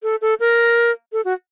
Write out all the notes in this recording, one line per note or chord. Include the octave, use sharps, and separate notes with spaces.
A4
A4
A#4
A4
F#4